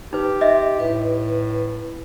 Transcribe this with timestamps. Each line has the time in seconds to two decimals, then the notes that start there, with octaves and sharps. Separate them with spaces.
0.13 D#4 G4 B4
0.41 D#5 E5 C6
0.80 A2 B4